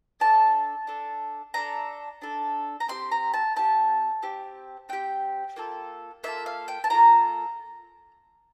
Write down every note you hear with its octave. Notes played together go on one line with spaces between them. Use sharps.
D4 A4 A5
D4 A4
D4 A4 A#5
D4 A4
A#5
C4 G4 C6
A#5
A5
C4 G4 A5
C4 G4
C4 G4 G5
A#3 F4 A4
A#3 F4 A4 E5
F5
G5
A5
A#3 F4 A4 A#5